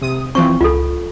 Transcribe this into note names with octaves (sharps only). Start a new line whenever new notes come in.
C3 D#6
E3 F3 C4 C#6
C#2 F4 A4